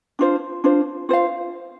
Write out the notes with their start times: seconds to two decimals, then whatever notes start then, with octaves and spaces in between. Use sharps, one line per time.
0.19 D4 F4 C5
0.64 D4 F4 C5
1.09 F4 C5 F5